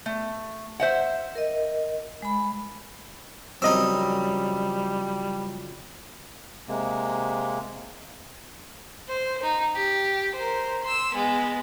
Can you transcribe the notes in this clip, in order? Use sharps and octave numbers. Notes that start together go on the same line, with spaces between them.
A3
C5 E5 F#5
A#4 D#5
G#3 B5
F2 C#3 F#3 G3 C4 D#4 D#5 E6
C3 G#3 A#3
C5
D#4
G4
A#4 C5
C6 E6
G#3 B3